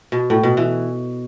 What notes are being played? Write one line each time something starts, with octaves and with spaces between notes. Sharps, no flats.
B2
A2
B2
E3